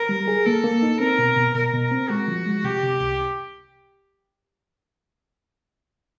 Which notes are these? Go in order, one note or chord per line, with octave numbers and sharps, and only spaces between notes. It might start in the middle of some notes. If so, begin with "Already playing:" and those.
Already playing: A#4
G3
G#4
A#3 A4
A#3
D#4
C4 A#4
B2
B2
B2 A#4
B2
C4
G#3 F#4
F3
G#3
C3 G4
C3
C2